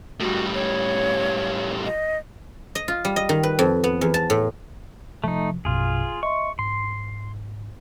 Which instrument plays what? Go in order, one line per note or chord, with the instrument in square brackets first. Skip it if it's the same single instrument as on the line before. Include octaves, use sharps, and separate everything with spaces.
[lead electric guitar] A2 G3 [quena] F#4
[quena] C#5
D#5
[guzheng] D#5
F4
G3
D#5
D#3
B4
F2
B3
E2
A5
A2
[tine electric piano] C3 F3 [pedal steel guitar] A3 D#4
[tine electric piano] A#1 F#2 B2 [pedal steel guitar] F4 G#4
[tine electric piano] D#5 E5 C6 [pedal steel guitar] C#6
[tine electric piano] G#2 [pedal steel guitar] C6